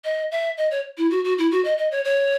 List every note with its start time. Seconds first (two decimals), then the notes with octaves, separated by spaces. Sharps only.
0.04 D#5
0.31 E5
0.58 D#5
0.71 C#5
0.98 E4
1.11 F#4
1.24 F#4
1.38 E4
1.51 F#4
1.65 D#5
1.78 D#5
1.92 C#5
2.05 C#5